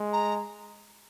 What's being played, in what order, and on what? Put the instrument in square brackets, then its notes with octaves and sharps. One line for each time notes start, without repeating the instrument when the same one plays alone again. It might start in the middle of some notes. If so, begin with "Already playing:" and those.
Already playing: [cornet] G#3
[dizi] A#5